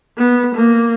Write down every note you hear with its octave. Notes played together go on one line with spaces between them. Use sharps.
B3
A#3